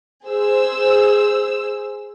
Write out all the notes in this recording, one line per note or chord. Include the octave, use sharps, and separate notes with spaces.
G#4 C5 E6